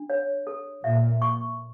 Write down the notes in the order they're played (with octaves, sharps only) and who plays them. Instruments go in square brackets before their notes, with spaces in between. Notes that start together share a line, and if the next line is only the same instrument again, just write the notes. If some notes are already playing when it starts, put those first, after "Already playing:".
Already playing: [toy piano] D4
C#5
A4
[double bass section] A#2 [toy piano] E5
[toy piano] C#6